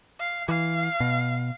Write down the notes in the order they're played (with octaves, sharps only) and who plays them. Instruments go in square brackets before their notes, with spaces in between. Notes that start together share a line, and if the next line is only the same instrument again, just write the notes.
[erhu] F5
[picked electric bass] E3 [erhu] F5
[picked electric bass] B2